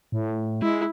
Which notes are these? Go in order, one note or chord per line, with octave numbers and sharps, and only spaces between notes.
A2
G#3 E4